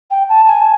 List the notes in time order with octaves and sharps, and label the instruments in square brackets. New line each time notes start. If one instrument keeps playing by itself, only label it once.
[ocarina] G5
A5
G#5